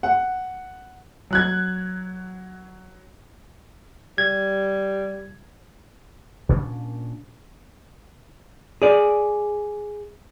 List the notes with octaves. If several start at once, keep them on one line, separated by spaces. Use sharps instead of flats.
F#5
F#3 F#6 G#6
G3 G#6
A#2 C#4 D4
G#4 D5